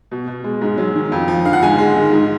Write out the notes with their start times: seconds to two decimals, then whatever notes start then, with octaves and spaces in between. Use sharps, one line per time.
0.11 B2
0.27 B2
0.44 G#3
0.61 G#2
0.78 F#3
0.95 D#3
1.12 F2
1.28 F3
1.45 D3 F5
1.53 F#5
1.62 G#2 G#5
1.78 G#3
1.96 D#3
2.12 G#2